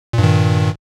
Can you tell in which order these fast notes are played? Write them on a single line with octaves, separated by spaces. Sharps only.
A#2 G2 D#3